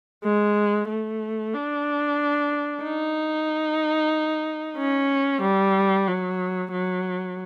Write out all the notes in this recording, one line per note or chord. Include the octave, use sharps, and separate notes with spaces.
G#3
A3
D4
D#4
C#4
G3
F#3
F#3